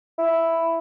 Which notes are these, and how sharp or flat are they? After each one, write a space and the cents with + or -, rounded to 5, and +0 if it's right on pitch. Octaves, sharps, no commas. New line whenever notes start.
E4 +0